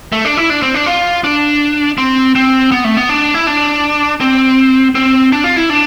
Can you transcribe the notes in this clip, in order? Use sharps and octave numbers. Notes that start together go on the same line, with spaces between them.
A3
D4
E4
D4
C4
D4
F4
D4
C4
C4
B3
A3
B3
D4
E4
D4
C4
C4
D4
F4
E4
D4